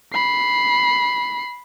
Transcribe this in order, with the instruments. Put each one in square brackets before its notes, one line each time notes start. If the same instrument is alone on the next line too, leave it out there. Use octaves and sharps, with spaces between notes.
[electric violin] B5 C7